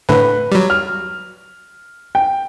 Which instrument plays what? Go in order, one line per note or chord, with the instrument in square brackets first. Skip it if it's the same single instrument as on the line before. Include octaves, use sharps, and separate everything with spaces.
[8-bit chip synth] A2 D3 [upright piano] B4
[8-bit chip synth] F#3 G3
[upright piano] F6
G5